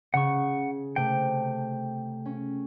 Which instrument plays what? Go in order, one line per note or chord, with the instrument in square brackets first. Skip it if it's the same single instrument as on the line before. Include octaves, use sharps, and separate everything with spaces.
[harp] C#3 [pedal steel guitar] F#5 C#6
[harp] C3 A3 [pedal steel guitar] G5
[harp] C#4